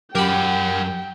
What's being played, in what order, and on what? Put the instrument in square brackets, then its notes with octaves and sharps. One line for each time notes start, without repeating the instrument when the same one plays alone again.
[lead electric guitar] F#2 [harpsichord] G4 B5 [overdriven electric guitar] A#4 F#5 [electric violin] G5